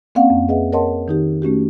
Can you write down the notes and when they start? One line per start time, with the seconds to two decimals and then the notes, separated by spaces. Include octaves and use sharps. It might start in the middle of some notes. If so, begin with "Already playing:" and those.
0.15 A#3 C4 C#4 D5 F5 F#5
0.30 F2
0.48 G#4 B4 D#5 E5 F#5
0.73 A#4 C#5 D#5 F#5 A5 C6
1.08 D#3 D#4 G4
1.42 A3 C#4 F#4 G4